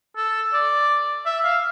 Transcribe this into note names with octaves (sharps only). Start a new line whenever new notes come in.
A4
D5
E5
F5